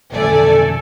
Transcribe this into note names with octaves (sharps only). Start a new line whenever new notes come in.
B1 F2 A3 A4 D5 G#5